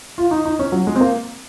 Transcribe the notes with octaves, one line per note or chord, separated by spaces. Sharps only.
F4
D#4
D#4
C#4
F#3
G#3
C4
A#3